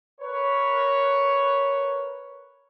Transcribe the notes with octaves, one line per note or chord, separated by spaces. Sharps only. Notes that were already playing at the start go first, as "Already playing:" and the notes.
A#4 B4 C#5